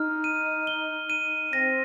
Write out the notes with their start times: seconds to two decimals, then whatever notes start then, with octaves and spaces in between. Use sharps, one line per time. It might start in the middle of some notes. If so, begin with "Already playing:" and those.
Already playing: D#4 F6
0.24 D#7
0.67 G7
1.10 D#7
1.52 C4 A#6